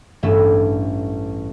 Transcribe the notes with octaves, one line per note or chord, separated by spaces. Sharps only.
A1 G2 A3 C#4 E5